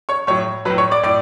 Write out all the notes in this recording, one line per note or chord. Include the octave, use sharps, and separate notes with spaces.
C#5 C#6
A2 F#3 C#5 C#6
A2 F#3 B4 B5
C#5 C#6
D5 D6
A2 D5 D6